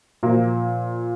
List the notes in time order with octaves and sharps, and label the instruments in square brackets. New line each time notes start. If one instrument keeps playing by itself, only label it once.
[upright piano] A#2 F3 A#3